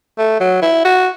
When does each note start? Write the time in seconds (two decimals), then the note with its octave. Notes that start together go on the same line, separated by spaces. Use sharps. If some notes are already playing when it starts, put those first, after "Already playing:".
0.18 A3
0.40 F#3
0.62 E4
0.85 F#4